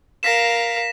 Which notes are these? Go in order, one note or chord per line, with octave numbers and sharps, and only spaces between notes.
A#4 F5 A#6 B6 E7